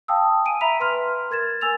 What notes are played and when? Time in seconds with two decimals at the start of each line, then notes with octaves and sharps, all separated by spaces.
0.08 F5 G5 A5 D#6 E6
0.45 G#5 D7 D#7
0.61 E5 A#5 B5 B6 F7
0.80 B4 C6 F6
1.31 A#4 G#6 A6 E7
1.61 A#4 G#5 E6 A6 F7